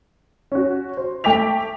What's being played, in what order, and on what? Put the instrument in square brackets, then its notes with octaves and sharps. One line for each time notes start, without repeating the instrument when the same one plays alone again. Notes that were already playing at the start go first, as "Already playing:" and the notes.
[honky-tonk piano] C#4 F#4
C5
A3 G5 D6 B6 F7